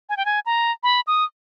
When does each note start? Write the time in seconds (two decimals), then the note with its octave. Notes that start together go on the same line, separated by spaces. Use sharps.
0.09 G#5
0.17 G5
0.25 G#5
0.46 A#5
0.83 B5
1.07 D#6